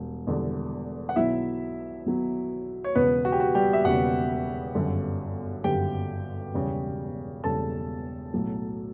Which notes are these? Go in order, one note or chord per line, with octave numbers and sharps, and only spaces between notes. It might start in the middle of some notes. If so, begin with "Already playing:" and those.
Already playing: E1 G3
E1 E2 D3 G3
F#5
B1 B2 F#3 E4 E5
B1 B2 F#3
C#5
E1 E2 C#3 B3 B4
F#4
G4
F#4
G3 G4
E5
E1 E2 C#3 F#4 F#5
G1 F#2 D3 G3
G1 F#2 D3 G3 G4 G5
E1 E2 C#3 G3
E1 E2 C#3 G3 A4 A5
B1 A2 F#3